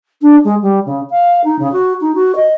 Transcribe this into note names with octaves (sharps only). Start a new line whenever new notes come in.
D4
G#3
G3
C#3
F5
D#4
C#3
F#4
D#4
F#4
D#5